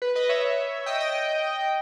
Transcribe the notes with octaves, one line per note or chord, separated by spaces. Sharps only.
B4
B4 D#5
C#5 E5
D#5 G5
D#5 G5